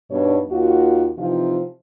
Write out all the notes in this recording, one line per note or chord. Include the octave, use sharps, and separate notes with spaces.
G2 B2 D4 D#4 B4 C#5
D#2 F4 F#4
C3 E3 F3 C4 D#4 F4